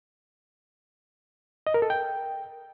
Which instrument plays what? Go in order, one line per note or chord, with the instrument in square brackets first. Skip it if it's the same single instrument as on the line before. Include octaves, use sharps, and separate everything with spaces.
[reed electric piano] D#5
A#4
A4
G5